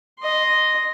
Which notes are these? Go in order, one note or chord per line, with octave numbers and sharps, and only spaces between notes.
D#5 C6